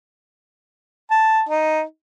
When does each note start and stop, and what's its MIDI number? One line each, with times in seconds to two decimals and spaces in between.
1.11 1.42 81
1.49 1.82 63